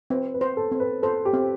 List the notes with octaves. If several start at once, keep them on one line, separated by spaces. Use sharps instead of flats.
C4 B4
B4
C5
A4
C4
B4
A4 C5
G4
C4